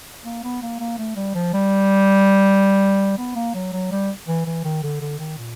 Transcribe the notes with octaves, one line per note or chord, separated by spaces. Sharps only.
A#3
B3
A#3
A#3
A3
G3
F3
G3
B3
A#3
F#3
F#3
G3
E3
E3
D#3
D3
D3
D#3
A#2